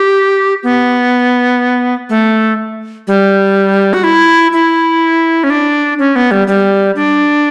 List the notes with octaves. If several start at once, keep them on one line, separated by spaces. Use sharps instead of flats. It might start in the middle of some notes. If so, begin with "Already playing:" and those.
Already playing: G4
B3
A3
G3
F#4
E4
E4
C#4
D4
C#4
B3
G3
G3
D4